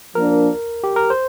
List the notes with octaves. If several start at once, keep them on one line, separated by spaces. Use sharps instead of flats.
F3 A#3 D4 A#4
G4
A#4
C5